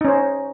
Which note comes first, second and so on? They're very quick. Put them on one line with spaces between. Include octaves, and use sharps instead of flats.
D#4 C#4 C5